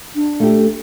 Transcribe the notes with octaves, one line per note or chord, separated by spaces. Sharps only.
D4
A3 G4